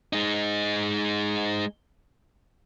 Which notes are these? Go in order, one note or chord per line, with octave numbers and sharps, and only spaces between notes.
G#3 D#4